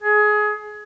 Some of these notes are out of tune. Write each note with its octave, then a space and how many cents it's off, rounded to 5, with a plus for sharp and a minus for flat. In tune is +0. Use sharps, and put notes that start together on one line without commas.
G#4 +20